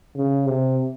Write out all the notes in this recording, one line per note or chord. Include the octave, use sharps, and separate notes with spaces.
C#3
C3